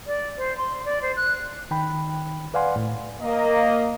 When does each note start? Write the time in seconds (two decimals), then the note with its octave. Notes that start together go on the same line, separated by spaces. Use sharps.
0.07 D5
0.38 C5
0.57 C6
0.85 D5
1.02 C5
1.16 F#6
1.71 D#3 G5 B5
2.54 B4 D5 F5 F#5 G#5 C6
2.76 A2
3.21 A#3 D#5